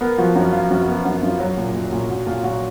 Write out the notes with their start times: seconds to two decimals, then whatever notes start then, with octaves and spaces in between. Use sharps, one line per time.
0.01 B3 A#4
0.18 F3 F#4
0.35 F#2 F#4
0.53 F3 F4
0.70 F#2 F#4
0.88 B3 F#4
1.05 F#2 F#4
1.23 F#2 F4
1.40 F#3 F#4
1.57 A#2
1.74 A#2
1.92 A#2
2.10 A#2 F#4
2.27 A#2 F4
2.44 A#2 F#4